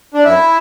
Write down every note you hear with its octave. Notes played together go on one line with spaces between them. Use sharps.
D4
F#2 E4